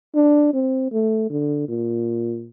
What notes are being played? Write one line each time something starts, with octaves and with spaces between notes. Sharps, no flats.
D4
C4
A3
D3
A#2